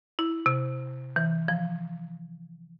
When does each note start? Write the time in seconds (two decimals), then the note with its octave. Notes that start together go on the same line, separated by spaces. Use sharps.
0.19 E4
0.46 C3
1.16 E3
1.48 F3